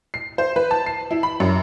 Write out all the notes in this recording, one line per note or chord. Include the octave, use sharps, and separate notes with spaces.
C7
C5
B4
A5
C7
E4
B5
F#2